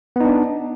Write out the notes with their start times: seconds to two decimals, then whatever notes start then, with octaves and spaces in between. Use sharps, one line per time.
0.16 B3
0.20 D#4
0.25 D4